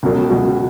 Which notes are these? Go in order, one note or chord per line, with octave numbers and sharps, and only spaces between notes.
C#2 B2 F#3
C#2 B2 F#3